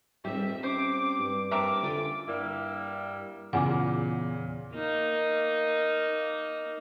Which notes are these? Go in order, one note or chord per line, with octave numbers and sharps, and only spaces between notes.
D#1 G3 C4 G4 E5
C#4 C5 D6
G2
F2 A#3 C4 A#4 E5 A5 D6
D3 C#4 F4 G5
G2 G3 A#3 E4
E2 A#2 C#3 F#5 G#5 D6
A#3 D#4